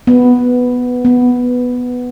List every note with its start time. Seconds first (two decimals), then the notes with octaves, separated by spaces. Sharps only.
0.07 B3
1.05 B3